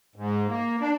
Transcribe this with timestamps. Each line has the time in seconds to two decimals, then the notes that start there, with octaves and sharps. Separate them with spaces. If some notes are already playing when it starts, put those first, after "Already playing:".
0.16 G#2
0.47 A#3
0.80 D4